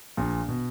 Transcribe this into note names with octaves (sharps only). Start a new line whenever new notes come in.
A#1 A#2
B2